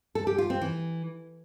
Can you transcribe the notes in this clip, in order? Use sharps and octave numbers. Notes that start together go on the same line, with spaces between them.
A4
G4
F4
C4
E3